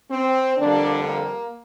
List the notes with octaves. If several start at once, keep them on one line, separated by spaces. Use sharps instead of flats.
C4
F2 D3 G3 A#3 D4
A#3